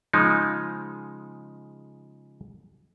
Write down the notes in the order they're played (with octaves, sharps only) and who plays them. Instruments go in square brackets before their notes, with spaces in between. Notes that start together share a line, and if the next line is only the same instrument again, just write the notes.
[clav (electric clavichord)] C#3 F3 G#3 D#4